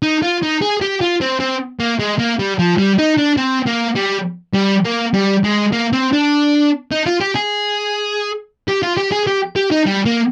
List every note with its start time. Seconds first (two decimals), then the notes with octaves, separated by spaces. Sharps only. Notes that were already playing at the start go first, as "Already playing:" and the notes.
0.03 D#4
0.23 F4
0.43 D#4
0.62 G#4
0.81 G4
1.01 F4
1.21 C4
1.40 C4
1.80 A#3
2.00 G#3
2.19 A#3
2.39 G3
2.59 F3
2.78 G3
2.98 D#4
3.18 D4
3.37 C4
3.67 A#3
3.96 G3
4.55 G3
4.85 A#3
5.14 G3
5.44 G#3
5.72 A#3
5.93 C4
6.13 D4
6.91 D#4
7.06 F4
7.20 G4
7.35 G#4
8.68 G4
8.83 F4
8.97 G4
9.12 G#4
9.27 G4
9.56 G4
9.71 D#4
9.86 G3
10.05 A#3